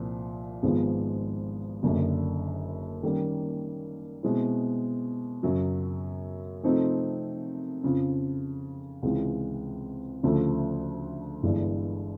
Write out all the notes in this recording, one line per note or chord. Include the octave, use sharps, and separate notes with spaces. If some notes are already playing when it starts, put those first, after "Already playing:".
Already playing: C2 A#2 F3
G#1 G#2 F3 G#3 B3
F#1 F#2 D3
D#3 G3 A#3 C#4
B2 G#3 C4 E4
F#2 C#3 F#3
C3 F3 A3 C4 D#4
F2 C#3 F3
C#2 C3 E3 G#3
D2 C#3 F3 A3
G1 G2 E3 G#3